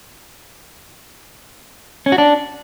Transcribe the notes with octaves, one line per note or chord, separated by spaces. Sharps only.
C#4
F#4
D4